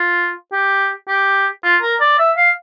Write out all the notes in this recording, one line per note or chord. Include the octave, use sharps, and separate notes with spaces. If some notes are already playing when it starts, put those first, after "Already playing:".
Already playing: F4
G4
G4
F4
A#4
D5
E5
F5